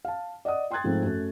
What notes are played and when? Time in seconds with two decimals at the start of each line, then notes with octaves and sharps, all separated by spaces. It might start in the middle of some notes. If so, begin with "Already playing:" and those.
0.05 F5 A5
0.45 D5 D#5 F#5 D#6
0.71 G5 C6 D#6 F#6 G#6 A6
0.84 G#2 F3 A3 C4
1.02 F#2 A3